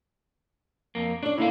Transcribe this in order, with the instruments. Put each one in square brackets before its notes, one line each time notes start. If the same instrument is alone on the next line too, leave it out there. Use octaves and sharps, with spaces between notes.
[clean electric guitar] F2 A#3
[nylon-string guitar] C#4 D5 [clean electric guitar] D4
[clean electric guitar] A2 A#3 F5 [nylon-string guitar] E4 A4